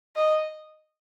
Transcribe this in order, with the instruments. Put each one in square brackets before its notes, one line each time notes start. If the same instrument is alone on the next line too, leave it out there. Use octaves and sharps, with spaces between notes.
[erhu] D#5